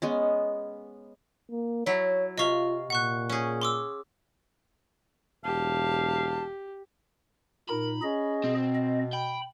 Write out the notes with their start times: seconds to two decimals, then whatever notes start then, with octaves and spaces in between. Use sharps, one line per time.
0.02 G#3 B3 C#4
1.51 A#3
1.86 F#3 E4 C#5
2.38 C3 F4 D#5 F5 C#6
2.90 A#2 F#5 C#6 F#6
3.29 C#4 G#4
3.62 C6 D6 E6
5.44 E1 G4 F5 A5
7.70 A#2 D#4 A#4 B5
8.02 C#4 G#4 D#5
8.44 B2 C4
8.74 D#5
9.13 G5 B5